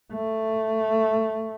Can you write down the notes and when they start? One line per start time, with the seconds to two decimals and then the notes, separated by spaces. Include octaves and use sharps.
0.13 A3